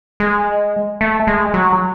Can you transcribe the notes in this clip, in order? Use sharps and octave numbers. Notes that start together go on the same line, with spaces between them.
G#3
A3
G#3
F#3